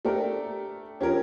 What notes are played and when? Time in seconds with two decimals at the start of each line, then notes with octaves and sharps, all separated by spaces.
0.05 A3 D4 G4 A#4
1.00 F3 C#4 G4 A#4